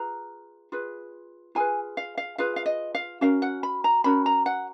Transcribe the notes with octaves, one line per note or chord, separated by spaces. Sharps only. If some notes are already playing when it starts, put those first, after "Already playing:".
Already playing: F4 G#4 B4 A#5
F4 G#4 B4
F4 G#4 B4 G#5
F5
F5
F4 G#4 B4 F5
F5
D#5
F5
C#4 F#4 A#4 F5
F#5
B5
A#5
C#4 F#4 A#4 B5
A#5
F#5